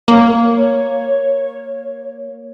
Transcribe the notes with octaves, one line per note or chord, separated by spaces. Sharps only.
A#3 C#5